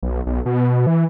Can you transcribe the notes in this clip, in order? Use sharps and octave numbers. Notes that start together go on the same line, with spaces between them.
B1
B1
B2
E3